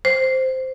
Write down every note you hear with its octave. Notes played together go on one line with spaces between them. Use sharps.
C5